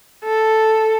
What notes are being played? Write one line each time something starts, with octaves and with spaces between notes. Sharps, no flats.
A4